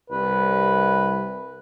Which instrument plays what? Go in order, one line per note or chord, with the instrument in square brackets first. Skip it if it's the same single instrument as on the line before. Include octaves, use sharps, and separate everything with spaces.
[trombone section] C2 [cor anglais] B4